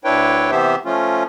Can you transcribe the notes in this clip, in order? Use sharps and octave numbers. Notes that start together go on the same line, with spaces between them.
D2 D4 E4 B4 C#5 G5
C3 E3 B3 G4 C5 E5
F3 A3 C#4 F4